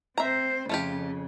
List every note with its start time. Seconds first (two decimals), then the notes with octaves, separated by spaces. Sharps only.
0.18 C4 C5 E5 A#5
0.69 F2 C#3 A3 F4 G4